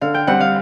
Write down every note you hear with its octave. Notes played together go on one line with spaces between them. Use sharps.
D3 F5
G5
G3 C4 F#5
F5